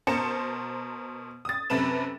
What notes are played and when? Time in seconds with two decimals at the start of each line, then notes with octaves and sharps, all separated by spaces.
0.07 B2 A#4 C5 A5 C#7 E7
1.45 D#6 A6
1.70 F#2 C3 A4 B4 E7